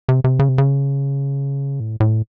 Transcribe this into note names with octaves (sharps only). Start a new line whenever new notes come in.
C3
C3
C#3
C3
C#3
A2
A2